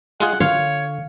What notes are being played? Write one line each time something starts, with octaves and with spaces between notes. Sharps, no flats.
G#3 F4 G#4 F#5
D3 F4 C#5 F5